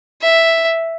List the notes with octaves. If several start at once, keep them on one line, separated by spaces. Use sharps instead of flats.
E5